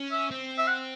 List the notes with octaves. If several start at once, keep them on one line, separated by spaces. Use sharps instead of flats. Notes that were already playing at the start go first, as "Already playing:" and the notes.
Already playing: C#4
E5
C4
E5
F#5